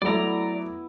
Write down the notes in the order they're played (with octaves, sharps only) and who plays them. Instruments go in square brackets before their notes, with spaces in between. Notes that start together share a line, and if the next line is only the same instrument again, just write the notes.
[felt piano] F#3 A3 [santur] B3 E4 [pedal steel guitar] D5 A#5